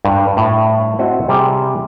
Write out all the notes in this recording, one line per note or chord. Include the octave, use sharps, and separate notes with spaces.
G2
A2
C4 E4 F#4 D#5 E5
C3 G3 G#4